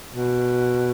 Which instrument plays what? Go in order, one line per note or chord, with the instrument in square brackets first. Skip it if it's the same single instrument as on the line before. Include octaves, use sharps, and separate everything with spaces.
[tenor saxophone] B2